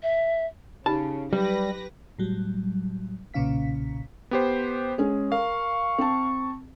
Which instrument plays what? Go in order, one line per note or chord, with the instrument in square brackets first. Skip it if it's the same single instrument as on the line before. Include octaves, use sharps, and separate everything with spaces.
[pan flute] E5
[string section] C#3 [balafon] D#4 G4 B5 [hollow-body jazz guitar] A5
[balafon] F#3 [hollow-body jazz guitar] G3 [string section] G4 B4 A#6
[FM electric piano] A2 F#3 G3
B1 A#2 C#3 C#4 F5 B6
[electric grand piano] B3 G4 C5
[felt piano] G#3 C#4 G#4
[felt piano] A#4 [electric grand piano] F5 [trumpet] C#6
[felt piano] C4 A5